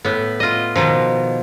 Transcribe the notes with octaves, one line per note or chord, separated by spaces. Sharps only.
A2 B3
F4 D#5
B2 D#3 F3